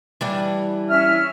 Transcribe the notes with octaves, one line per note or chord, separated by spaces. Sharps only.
E3 G3 D4
C#4 E5 F6